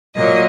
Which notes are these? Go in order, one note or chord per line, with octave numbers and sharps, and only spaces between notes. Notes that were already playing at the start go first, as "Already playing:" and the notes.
A#2 F#3 A#3 D#5